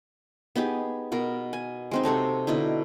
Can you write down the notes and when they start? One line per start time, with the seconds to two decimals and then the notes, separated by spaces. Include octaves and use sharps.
0.55 B3 D#4 G4 G#4
1.12 B2 B3 A#4
1.53 G#5
1.91 G#3 C4 D#4
2.03 C3 F#4 A4 C#5
2.47 B2 D3 D#4 E4